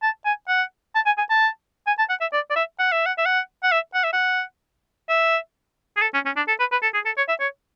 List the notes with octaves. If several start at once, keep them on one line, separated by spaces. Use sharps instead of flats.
A5
G#5
F#5
A5
G#5
G#5
A5
G#5
A5
F#5
E5
D5
D5
E5
F#5
E5
F#5
E5
F#5
F#5
E5
F#5
E5
F#5
E5
G#4
A4
C#4
C#4
D4
A4
B4
B4
A4
G#4
A4
C#5
E5
C#5